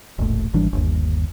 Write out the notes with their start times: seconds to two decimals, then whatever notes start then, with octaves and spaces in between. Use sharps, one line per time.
0.18 E1 A#1 A2
0.54 G#1 E3 G3 D4
0.73 G1 D#2